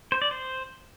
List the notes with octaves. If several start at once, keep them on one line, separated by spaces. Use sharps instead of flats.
C5
D5
C5